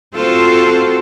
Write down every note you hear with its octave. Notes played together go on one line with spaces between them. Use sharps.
C4 F4 F#4 A4 C5